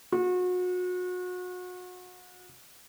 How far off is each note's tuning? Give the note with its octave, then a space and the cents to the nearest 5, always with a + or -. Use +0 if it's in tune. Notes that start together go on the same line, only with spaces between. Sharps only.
F#4 -35